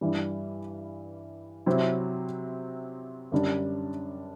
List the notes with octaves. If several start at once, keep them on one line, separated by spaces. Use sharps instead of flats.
G2 E3 G3
C3 F#3 C4 E4
F#2 D3 G3 D4